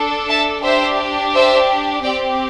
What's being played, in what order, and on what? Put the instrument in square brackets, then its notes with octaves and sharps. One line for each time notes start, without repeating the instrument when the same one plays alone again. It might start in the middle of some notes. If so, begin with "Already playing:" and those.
Already playing: [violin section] D4 A4
E5 A5
D4 G4 C5 E5
C5 E5
C4 G4 D5 G5